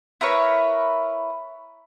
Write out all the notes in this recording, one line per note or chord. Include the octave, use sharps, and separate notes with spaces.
E4 A#4 B4 C#5